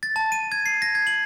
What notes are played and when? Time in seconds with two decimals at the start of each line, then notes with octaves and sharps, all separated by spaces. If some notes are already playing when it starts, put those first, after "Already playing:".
0.03 A6
0.16 A5
0.32 D#7
0.52 G#6
0.66 C7
0.82 A#6
0.95 G#6
1.07 F#7